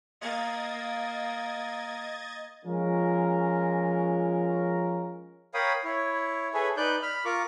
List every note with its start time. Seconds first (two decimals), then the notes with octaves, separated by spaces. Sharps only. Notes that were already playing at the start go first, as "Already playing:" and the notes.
0.21 A#3 D#5 G#6 A6
2.65 F3 G#3 C#4 F4 A#4
5.54 A#4 C#5 F5 G5 B5 D#6
5.84 E4 C#5
6.54 G#4 A4 B4 C#5 E5 G#5
6.77 D#4 B4 D5 F#6 G6
7.03 B5 F6
7.25 F4 A#4 C#6 D6